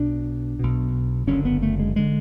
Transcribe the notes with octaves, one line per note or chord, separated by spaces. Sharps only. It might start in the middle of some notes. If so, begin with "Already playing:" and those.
Already playing: B1 B2 D4
B1 B2
F#1 F#2 D3 C#4
B3
A3
G#3
D3 G#3